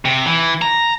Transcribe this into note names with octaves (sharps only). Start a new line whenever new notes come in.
C3
E3
A#5